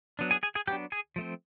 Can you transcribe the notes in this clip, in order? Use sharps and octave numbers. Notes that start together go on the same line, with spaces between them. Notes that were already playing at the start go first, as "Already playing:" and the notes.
F#3 B3 D4
G#4 G#5
G#4 G#5
G#4 G#5
F#3 B3 D4 G4 G5
G#4 G#5
F3 A3 C4